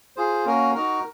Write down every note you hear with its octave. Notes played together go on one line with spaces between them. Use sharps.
F4 G#4 C5
A#3 C#4 F#4 A#4
D#4 F#4 A#4